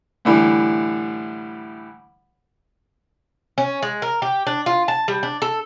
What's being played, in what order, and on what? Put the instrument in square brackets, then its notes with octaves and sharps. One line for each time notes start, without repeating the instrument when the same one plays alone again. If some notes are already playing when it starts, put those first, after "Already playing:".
[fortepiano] A2 D3 E3 G3
[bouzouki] C#4
G#3
A#4
G4
D4
F4
A5
G3
D4
A4